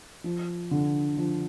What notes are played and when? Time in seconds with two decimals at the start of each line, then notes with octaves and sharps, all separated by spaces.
0.24 F3
0.71 D3
1.17 F3